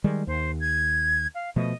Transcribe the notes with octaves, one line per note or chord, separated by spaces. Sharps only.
D#3 G3 G#3
D#2 C5
G#6
F5
B2 F3 A3 D#5